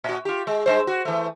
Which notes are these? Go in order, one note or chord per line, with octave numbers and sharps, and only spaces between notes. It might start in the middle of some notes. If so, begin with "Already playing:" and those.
A#2 F#4
F4 G4
G#3
G2 G#3 C5
F#4
E3 A3